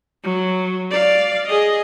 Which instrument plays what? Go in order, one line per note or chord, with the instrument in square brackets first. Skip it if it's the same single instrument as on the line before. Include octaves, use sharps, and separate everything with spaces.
[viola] F#3
D5 F5
G#4 D#5